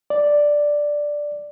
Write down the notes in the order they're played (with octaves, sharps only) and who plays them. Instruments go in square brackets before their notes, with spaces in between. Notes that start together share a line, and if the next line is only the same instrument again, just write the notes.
[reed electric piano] D5